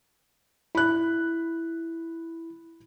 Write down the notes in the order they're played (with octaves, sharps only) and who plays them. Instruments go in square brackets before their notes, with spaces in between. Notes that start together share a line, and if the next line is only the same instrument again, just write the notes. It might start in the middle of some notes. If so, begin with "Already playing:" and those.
[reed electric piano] E4 [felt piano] B5 F#6